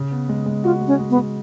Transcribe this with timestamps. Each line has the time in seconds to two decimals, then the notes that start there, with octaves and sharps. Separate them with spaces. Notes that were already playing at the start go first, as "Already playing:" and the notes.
Already playing: C#3
0.11 B3
0.29 G#3
0.46 G#3
0.64 F4 F#4
0.81 G#3
0.87 C#4
0.99 G#3
1.10 B3
1.17 G#3